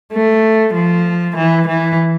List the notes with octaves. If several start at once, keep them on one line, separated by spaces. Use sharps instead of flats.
A3
F3
E3
E3